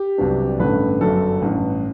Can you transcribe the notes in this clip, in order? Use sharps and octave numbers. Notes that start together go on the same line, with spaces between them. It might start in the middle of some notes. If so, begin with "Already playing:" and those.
Already playing: G4
C2 C3 F#3 B3 D4
A1 G2 D3 A3 B4
G1 F#2 F#3 A4
A1 G2 E3